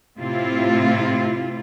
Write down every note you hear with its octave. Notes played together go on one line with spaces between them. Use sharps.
A2 C3 C4 E4 F4